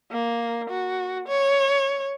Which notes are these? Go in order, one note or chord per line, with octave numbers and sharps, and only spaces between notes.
A#3
F#4
C#5